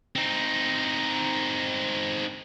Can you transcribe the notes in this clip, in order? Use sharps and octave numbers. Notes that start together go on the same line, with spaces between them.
C4 D#4